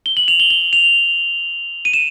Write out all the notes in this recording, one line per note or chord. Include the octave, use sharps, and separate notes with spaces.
G7
F#7
F7
G7
G7
F7
D#7
E7